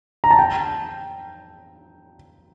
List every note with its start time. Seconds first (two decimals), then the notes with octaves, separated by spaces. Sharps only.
0.24 A#5
0.31 A5
0.39 G5